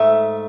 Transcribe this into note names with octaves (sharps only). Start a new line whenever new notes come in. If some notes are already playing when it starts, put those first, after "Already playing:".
Already playing: G#2 A3 E5